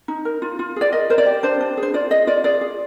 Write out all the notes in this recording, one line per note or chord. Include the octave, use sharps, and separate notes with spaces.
D#4
A#4
F4
F4
G#4 D5
A#4 D#5
A#4 C5
D5
G4
D4 C5
D4
G#4
C5
F4 D5
G#4 D#5
F4 D5
G#4 D5
G#4